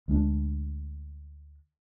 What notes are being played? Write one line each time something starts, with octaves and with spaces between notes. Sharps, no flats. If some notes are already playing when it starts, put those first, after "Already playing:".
D2 G#3 C#4 D4